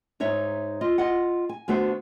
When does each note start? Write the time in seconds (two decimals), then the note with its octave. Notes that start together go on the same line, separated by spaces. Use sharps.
0.20 G#2 D#4 C#5 E5
0.81 F4 D#5
0.98 F4 D#5 F#5
1.49 G#5
1.68 D3 A3 B3 F#4 C5